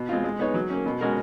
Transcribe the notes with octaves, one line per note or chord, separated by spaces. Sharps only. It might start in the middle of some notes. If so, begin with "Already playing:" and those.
Already playing: B2
G#3 C4 F4
G#3
B3 D#4 G#4 C#5
F#3
A#3 C#4
B2
G#3 C#4 F#4 A#4